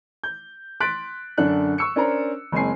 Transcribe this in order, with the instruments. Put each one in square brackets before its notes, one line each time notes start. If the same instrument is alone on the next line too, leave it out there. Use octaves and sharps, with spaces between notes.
[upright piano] G6
C6 F#6 A6 B6 D7
F#2 D3 D4 A4 F#6
C#6 E6 C#7
C#4 D4 A#4 C5 D5 A#5
F#1 G#3 C4 G#5 C7